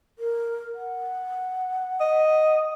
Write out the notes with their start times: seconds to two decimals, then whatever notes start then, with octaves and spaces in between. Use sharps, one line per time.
0.19 A#4
0.74 F#5
2.00 D#5